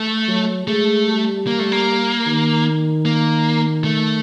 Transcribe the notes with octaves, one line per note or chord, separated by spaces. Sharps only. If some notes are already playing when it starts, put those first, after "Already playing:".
Already playing: A3
F#3
G#3 A3
G3
A#3
A3
A#3
D#3
A#3
A3